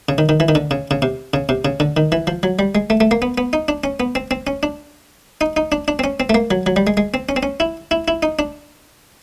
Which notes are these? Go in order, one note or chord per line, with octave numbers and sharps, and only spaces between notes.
C#3
D#3
D#3
E3
D#3
D3
C#3
C#3
C3
C#3
C3
C#3
D3
D#3
E3
F3
F#3
G3
G#3
A3
A3
A#3
B3
B3
D#4
D4
C#4
B3
C4
C4
C#4
D4
D#4
D#4
D4
D4
C4
C#4
C4
A3
A#3
F#3
F#3
G3
G#3
G#3
C4
C#4
C4
C#4
E4
E4
E4
D#4
D4